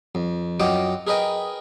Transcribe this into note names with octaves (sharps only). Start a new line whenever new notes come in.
F2
F#2 F4 D#5 F#5 G5 D6
G#4 A#4 B4 D#5 G5